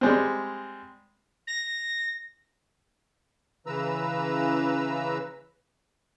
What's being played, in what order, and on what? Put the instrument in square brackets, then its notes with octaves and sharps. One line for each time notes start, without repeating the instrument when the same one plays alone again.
[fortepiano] G3 G#3 C4
[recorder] A#6
[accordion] C#3 E3 B4 A#5 E6